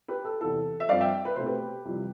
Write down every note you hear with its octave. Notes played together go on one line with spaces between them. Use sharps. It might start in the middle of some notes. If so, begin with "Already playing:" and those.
G4 B4
A4
E2 C3 E3 A4
E5
G2 F3 C4 D5 F5
E5 G5
B4
B2 A3 C4 C5
G4 B4
F2 C3 E3 G3